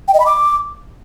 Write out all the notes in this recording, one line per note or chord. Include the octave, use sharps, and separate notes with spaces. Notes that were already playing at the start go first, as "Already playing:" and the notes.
G5
D#5
B5
D6